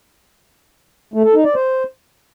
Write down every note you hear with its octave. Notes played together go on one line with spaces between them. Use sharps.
A3
A4
D#4
D5
C5